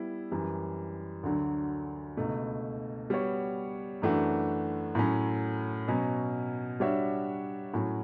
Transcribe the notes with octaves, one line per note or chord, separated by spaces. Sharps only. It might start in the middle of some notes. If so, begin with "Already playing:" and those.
Already playing: G3 B3 E4
F#2 E3 G3
D2 D3 F#3
C#2 B2 A3
G3 B3 F#4 C#5
F#2 E3 A3 D4 F#4
A2 F#3 C#4
B2 F#3 C#4
G3 D4 F#4 C#5 E5
A2 F#3 C#4 F#4